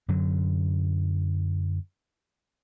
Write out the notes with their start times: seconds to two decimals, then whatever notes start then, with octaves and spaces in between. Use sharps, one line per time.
0.08 F#2 D3 F#3